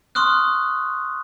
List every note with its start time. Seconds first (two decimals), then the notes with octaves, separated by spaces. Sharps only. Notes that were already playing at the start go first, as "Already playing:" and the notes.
0.15 C6 C#6 D#6 F6 F#6